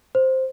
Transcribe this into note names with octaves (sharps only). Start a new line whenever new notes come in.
C5